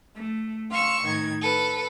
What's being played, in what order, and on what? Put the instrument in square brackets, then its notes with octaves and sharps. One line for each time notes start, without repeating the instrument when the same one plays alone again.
[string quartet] A3
F5 C6 C#6 E6
A2 D#3 G#6
A4 B4